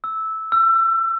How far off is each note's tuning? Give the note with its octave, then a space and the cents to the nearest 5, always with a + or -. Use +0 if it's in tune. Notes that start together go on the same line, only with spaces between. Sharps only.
E6 -10
E6 +30